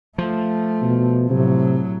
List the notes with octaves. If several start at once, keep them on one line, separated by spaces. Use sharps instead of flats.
F3 A3
B2
A2 C3 F#3